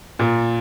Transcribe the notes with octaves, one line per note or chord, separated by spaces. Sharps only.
A#2